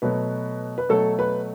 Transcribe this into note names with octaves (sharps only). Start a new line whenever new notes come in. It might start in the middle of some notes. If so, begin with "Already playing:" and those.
B2 F#3 A3 B4
B4
B2 F#3 A3 A4
B4